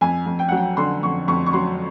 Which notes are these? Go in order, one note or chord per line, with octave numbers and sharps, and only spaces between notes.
F2 G#5
F2
G5
F#3 F#5
G5
D3 C6
F2 C#6
F2 C#6
C#6
F#3 C6